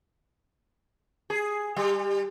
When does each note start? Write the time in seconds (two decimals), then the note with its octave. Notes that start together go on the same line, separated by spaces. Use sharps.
1.30 G#4
1.76 G3